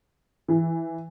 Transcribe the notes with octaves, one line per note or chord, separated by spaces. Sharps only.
E3